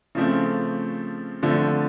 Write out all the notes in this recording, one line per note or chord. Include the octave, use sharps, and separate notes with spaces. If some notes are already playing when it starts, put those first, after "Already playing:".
C#3 F3 A3 C4
D3 F3 A3 C4